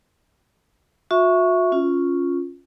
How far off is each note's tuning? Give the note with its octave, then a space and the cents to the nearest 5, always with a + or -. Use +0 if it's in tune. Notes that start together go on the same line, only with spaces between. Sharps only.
F#4 -40 E5 +0 C#6 +0
C#4 +0 F4 +0